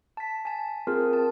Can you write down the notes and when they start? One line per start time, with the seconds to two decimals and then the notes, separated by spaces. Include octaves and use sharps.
0.17 A5 B6
0.45 G#5 A5
0.87 C4 F4 G#4 A#4
1.13 A5